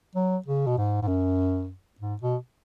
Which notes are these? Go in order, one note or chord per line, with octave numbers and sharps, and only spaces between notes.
F#3
C#3
B2
G#2
G#2
F#2
G#2
B2